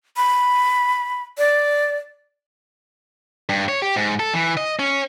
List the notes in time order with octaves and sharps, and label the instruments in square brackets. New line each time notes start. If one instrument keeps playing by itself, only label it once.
[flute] B5
D5
[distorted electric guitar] G2
C#5
G4
G#2
A4
E3
D#5
C#4